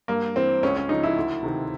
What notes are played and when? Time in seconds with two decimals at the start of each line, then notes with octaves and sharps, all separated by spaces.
0.08 G2 A#3
0.36 E3 C4
0.63 C#2 C#4
0.77 C#4
0.89 C#3 F3 D#4
1.03 E4
1.17 D2
1.43 C3 D#3